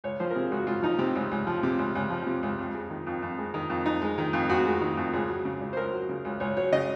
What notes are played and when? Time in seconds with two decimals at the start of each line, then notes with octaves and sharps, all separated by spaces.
0.04 C#2 C#5
0.20 F3 C5
0.31 A#4
0.35 C3 G#4
0.51 C#2 F#4
0.67 C#2 F4
0.83 F3 D#4
0.99 C3 C4
1.15 C#2
1.31 C#2
1.47 F3
1.63 C3
1.79 C#2
1.95 C#2
2.10 F3
2.26 C3
2.43 C#2
2.58 F2
2.74 G#3
2.90 D#3
3.07 F2
3.22 F2
3.38 G#3
3.54 D#3
3.70 F2
3.86 F2 D#4
4.02 G#3
4.18 D#3
4.33 F2
4.49 F2 F#4
4.65 G#3
4.81 D#3
4.97 F2
5.13 C#2 G#4
5.29 F#3
5.45 C#3
5.61 C#2
5.73 C5
5.77 C#2 A#4
5.93 F#3
6.09 C#3
6.25 C#2
6.40 C#2 C#5
6.57 F#3 C#5
6.72 C#3 D#5